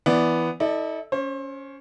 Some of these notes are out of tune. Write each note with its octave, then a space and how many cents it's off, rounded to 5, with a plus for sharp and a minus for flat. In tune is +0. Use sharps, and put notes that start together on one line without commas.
E3 +0 B3 +0 D5 +0
E4 -45 A4 +0 D5 +30
C#4 +10 C5 +35